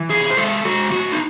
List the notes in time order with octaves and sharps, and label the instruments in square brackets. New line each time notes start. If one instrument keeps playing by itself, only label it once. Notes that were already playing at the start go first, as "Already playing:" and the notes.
Already playing: [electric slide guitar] E3
C3 G#4
C5
G#3 A4
G#3 F#4
A2 F#4
D#4